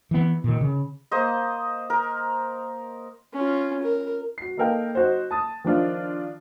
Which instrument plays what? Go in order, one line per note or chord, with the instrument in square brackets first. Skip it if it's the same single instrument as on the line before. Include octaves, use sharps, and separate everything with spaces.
[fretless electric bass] E3 B3
A#2 D#3
C#3
[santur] A#3 C5 D#5
A#4
[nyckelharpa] C#4 F4
A#4
[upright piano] F#4 C7
A#3 D#4 A4 A#4 F5 G5
D#4 F#4 C5
A5 D#6 A6
D#3 F3 D4 F4